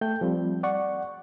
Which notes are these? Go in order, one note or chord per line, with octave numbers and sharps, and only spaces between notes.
A3 G5 G6
F3 G3 C4
D5 F#5 C#6